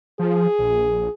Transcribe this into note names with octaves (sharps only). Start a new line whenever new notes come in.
F3 G#4
A#1